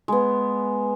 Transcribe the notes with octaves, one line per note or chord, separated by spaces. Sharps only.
G#3 B3